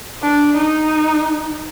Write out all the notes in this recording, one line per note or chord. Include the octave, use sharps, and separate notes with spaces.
D4
D#4